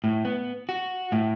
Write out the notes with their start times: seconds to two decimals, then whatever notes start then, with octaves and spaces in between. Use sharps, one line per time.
0.04 A2
0.25 B3
0.69 F#4
1.12 A2